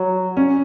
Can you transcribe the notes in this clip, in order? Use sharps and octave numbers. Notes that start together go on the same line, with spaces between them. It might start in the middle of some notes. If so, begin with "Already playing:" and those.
Already playing: F#3
C#4